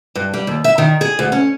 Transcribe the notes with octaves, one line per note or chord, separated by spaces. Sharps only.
G2
G3
D#2
E5
D#3
G#4
D2
C#4